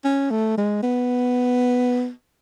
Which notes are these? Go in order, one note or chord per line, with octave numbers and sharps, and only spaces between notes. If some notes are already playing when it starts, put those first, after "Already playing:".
C#4
A3
G#3
B3